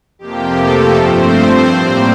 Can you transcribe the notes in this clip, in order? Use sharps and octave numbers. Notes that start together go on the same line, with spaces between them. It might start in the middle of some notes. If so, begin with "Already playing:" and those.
F2 C3 F3 A#3 G4
A3 A4
G2 F3 A3 C4 C5
A2 G3 A#3